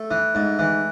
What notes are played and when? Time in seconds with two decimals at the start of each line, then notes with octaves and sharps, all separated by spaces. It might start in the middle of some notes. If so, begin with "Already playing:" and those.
Already playing: A3
0.11 E3
0.35 G#2
0.59 E3